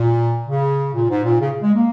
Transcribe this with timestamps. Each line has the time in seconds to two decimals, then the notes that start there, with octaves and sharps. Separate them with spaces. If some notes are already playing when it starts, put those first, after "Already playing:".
Already playing: A#2
0.47 C#3
0.94 A#2
1.09 G#2
1.24 A#2
1.40 C#3
1.62 G#3
1.74 A#3